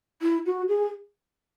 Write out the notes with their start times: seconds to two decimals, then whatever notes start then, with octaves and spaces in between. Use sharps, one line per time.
0.22 E4
0.46 F#4
0.68 G#4